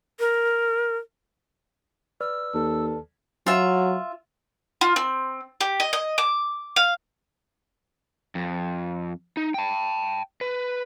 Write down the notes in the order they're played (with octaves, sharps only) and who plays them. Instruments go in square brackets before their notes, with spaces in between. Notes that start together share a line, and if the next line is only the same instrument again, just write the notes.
[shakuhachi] A#4
[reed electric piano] B4 D5 F6 [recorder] E6
[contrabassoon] D#2 [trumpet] A4
[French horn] F#3 [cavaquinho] F4 E5
[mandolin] F4
C4
G4
D#5
D#5
D6
F5
[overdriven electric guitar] F2
D#4
G5 A5
B4